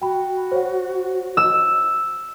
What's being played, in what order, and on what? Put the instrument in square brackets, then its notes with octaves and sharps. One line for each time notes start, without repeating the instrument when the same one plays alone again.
[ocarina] F#4 [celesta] G5 B5
[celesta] C5 C#5 F#5
[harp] E6